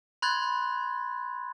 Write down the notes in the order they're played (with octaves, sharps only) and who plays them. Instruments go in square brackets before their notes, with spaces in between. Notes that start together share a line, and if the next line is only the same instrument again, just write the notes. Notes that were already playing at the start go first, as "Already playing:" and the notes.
[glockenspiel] B5 C6 F#6 G#6 A6